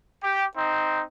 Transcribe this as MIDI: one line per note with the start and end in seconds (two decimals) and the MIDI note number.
0.23 0.45 67
0.56 1.02 60
0.56 1.02 63